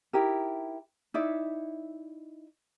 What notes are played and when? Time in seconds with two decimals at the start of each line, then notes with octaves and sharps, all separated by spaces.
0.13 D#4 E4 G4 A#4
1.14 D#4 E4 D5 E5